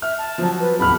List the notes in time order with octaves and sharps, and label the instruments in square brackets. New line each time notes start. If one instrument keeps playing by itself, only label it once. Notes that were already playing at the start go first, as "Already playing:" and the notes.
[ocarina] E5 [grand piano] F6
[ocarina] A5
[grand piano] F3 F#3
[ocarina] B4
[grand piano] D1 E2 F6 [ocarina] B5